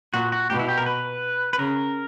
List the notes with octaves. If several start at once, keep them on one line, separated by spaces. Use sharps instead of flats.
A#2 F#4
F#4
B2 G4
E4
G4
A#4
B4
B4
C#3 A#4